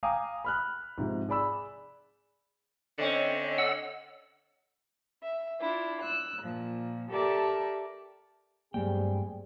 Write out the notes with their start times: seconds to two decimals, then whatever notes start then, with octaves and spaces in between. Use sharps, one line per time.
0.03 F5 G5 G#5 A#5 D6 D#6
0.45 B5 F6 F#6
0.98 G#2 C3 F3
1.28 G#4 D5 B5 E6
2.98 D3 A3 C4 C#4 C#5 D#5
3.58 F#5 E6
5.22 E5
5.60 D4 E4 F4
6.00 E6 F#6
6.42 A#2 F3
7.10 G4 A4 A#4 D5 E5 A5
8.74 G2 F#3 G3 A3 A#3 C4 G#4 G5